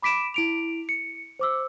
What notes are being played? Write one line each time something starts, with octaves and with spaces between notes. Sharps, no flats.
B5 D6 B6 D7 E7
E4 D7 F7
C#7
C5 D6 E6